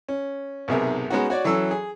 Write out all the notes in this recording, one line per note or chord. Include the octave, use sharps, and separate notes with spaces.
C#4
B1 G#2 C3 G#4 A#4 E5
G#3 B3 C#4 D#4 F#4
F#4 C#5 D5
E3 F#3 C#4 A4 E6
G#4